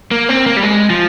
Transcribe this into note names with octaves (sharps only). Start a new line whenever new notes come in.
A#3
C4
A#3
G3
G#3
F3